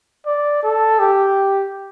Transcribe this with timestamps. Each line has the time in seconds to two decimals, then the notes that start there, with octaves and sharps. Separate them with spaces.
0.26 D5
0.63 A4
0.99 G4